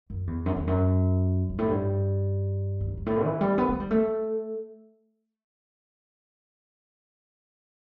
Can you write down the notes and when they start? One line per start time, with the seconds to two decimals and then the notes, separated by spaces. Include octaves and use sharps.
0.10 F#2
0.27 E2
0.46 F#2
0.56 E2
0.67 F#2
1.50 G2
1.58 A2
1.68 G2
2.80 E2
2.88 F#2
2.97 G2
3.06 A2
3.24 E3
3.41 G3
3.58 B3
3.69 A3
3.80 G3
3.91 A3